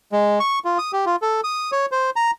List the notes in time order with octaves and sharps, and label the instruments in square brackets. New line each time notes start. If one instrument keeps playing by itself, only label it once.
[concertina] G#3
C#6
F4
D#6
G4
F4
A4
D#6
C#5
C5
A#5